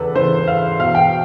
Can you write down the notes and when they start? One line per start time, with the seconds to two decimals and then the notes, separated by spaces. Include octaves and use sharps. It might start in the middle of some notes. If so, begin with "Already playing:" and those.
Already playing: E2 C#3 E3 A4 B4
0.15 E2 C#3 E3 C5
0.48 F5
0.79 E2 B2 F5
0.95 G5